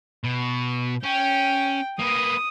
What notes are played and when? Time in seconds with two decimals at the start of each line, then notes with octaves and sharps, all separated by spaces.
0.25 B2
1.03 C#4 G5
1.99 A#3 B3 D#6